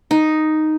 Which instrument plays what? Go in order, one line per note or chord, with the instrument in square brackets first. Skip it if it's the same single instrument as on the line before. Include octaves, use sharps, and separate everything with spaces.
[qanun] D#4